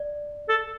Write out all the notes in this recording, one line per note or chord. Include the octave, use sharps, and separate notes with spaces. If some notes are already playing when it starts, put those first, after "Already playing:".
Already playing: D5
A4